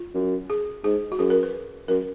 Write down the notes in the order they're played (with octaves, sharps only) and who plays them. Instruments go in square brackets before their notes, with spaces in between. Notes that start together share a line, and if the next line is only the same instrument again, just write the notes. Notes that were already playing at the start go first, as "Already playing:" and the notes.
Already playing: [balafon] F4
[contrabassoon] F#2
[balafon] G#4
[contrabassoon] G#2 [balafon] G#4
[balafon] F#4
[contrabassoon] F#2 [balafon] G#4
[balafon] A#4
B4
[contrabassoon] F#2 [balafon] A#4